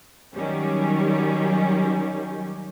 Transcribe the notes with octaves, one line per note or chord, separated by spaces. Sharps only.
D#3 F#3 G3 C#4